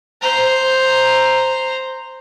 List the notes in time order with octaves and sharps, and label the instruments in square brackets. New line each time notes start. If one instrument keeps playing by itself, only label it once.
[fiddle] C5 A#5